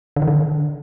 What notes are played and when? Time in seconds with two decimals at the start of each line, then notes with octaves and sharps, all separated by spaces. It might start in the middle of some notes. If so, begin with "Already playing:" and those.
0.16 D3
0.22 D#3
0.28 D3